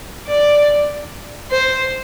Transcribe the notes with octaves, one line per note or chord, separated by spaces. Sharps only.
D5
C5